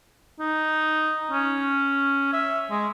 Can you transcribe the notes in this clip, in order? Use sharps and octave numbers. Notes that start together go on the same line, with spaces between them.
D#4
C#4
E5
G#3